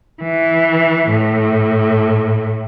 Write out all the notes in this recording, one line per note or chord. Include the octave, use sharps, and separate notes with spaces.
E3
A2